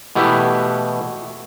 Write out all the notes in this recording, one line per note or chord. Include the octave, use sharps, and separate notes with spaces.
B2 E3 A3 B3 E4 G4